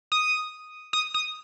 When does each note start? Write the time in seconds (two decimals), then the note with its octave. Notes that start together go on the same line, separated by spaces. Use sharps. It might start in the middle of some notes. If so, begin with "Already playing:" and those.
0.12 D#6
0.93 D#6
1.14 D#6